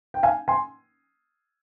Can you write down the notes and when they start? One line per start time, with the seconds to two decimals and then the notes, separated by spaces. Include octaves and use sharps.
0.14 G5
0.23 F5 G#5
0.48 G#5 C6